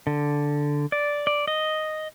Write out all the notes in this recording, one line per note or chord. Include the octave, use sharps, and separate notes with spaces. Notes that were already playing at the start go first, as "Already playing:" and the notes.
D3
D5
D5
D#5